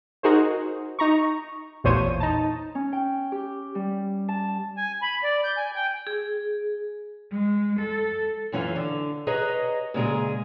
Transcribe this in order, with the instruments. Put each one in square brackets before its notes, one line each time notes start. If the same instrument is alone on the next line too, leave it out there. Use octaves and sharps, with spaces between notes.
[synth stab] D#4 F#4 G#4 A#4 C5
D#4 A#5 C#6
A1 E2 A#2 C5 C#5 D#7
D#4 A5
[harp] C#4
G5
G4
G3
A5
[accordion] G#5
B5
D5
G6
G#5
G5
[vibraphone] G#4
[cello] G#3
A4
[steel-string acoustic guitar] F#2 E3 C#4 F4 F5
D3
G#4 B4 C#5 D#5 A#5
A#2 C#3 G#3 G#4